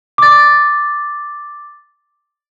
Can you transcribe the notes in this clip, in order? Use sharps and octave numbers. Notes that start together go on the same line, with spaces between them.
D6 A6